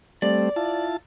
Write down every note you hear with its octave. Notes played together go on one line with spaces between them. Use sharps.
G3 A3 C4 D5
E4 F4 A5